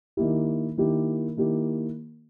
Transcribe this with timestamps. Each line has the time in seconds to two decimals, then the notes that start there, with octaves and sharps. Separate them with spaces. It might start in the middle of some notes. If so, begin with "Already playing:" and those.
0.17 D#3 A#3 E4 G4
0.78 D#3 A#3 E4 G4
1.37 D#3 A#3 E4 G4